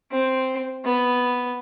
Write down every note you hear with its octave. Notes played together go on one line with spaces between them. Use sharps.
C4
B3